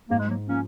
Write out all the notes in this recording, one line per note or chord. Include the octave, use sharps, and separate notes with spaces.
G#2 A#3
G#3
F#3 A#3
F3 A#3 C#4